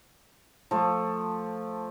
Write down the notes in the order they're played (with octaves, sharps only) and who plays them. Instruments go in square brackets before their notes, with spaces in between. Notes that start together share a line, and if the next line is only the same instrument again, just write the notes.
[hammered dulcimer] F3 A3